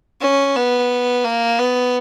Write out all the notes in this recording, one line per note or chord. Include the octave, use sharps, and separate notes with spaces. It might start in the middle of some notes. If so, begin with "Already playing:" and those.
C#4
B3
A#3
B3